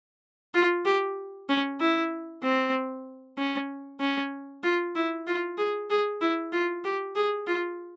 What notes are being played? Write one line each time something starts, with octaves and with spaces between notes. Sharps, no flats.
F4
G4
C#4
E4
C4
C#4
C#4
F4
E4
F4
G#4
G#4
E4
F4
G4
G#4
F4